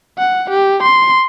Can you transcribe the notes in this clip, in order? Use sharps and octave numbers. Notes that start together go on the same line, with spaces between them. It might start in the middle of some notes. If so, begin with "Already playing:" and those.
F#5
G4
C6